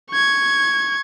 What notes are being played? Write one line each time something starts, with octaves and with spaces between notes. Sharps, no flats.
C#6 G#6